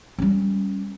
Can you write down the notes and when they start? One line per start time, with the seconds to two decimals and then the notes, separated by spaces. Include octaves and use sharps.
0.18 G3 C#4